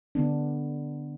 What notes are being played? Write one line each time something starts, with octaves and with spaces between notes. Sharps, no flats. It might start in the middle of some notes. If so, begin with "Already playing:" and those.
D3 B3 D4